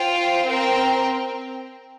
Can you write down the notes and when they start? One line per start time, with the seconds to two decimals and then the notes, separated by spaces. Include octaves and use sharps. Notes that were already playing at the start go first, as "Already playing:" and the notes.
Already playing: F4 C5 G5
0.46 C4 A#4 G5